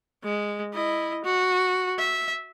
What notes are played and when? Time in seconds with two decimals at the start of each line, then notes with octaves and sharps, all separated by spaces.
0.24 G#3
0.73 E4 D#5
1.24 F#4
1.99 E5